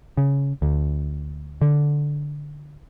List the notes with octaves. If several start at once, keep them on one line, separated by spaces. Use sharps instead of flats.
C#3
D2
D3